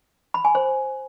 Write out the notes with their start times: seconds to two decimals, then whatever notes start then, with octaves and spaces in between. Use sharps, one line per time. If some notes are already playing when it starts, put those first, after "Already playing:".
0.34 B5
0.45 G#5
0.55 C5